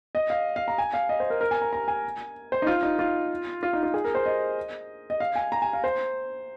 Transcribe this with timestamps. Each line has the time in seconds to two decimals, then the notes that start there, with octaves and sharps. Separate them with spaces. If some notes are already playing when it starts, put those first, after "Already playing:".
0.15 D#5
0.30 F5
0.56 F5
0.68 A#5
0.78 G#5
0.94 F5
1.09 D#5
1.20 C5
1.30 A#4
1.41 A#4
1.51 G#5
1.62 A#5
1.73 A#5
1.88 G#5
2.52 C5
2.62 D#4
2.67 F4
2.83 D#4
2.99 F4
3.63 F4
3.73 D#4
3.83 F4
3.94 G#4
4.04 A#4
4.15 C5
4.26 D#5
5.10 D#5
5.20 F5
5.35 G#5
5.52 A#5
5.62 G#5
5.73 F5
5.84 C5